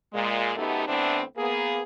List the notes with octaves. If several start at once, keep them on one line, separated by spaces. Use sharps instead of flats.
A#2 G#3
F#2 A3 B3 D#4 G4 A4
A2 E3 B3 C4 D4
A#3 B3 G#4